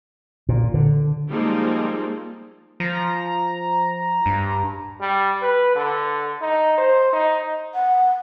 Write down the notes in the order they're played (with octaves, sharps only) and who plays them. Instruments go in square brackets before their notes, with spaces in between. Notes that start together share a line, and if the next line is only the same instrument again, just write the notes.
[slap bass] A#2
D3
[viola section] F3 G3 G#3 A#3 C4 D#4
[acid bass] F3 [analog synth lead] A#5
[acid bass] G2
[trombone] G3
B4
D3
D#4
C5
D#4
[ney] F#5